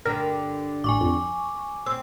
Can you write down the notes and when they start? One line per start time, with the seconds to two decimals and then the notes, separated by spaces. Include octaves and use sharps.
0.05 G2 D3 A#4
0.84 A1 G#5 C#6 D6
1.01 F2
1.86 C4 E6